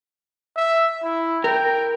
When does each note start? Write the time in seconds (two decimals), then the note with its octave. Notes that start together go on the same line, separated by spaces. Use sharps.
0.56 E5
1.03 E4
1.44 A#4 G5